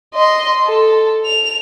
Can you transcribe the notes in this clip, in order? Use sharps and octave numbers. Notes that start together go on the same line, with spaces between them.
D#5 C6
A4
F7